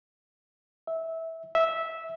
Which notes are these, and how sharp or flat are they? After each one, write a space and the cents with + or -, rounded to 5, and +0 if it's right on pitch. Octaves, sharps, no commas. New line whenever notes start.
E5 -15
E5 -10